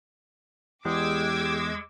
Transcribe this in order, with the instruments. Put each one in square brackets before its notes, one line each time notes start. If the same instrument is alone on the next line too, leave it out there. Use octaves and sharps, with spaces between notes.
[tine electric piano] E2 [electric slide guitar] G#3 [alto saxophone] G4 [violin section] D6 E6 G#6